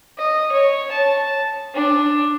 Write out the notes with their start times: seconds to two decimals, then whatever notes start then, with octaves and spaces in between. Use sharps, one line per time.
0.18 D#5
0.52 C#5
0.91 A5
1.74 D4